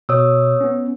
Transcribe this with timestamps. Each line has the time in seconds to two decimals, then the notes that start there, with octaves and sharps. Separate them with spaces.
0.09 B2 C#5 D#6 E6
0.61 B3 C#4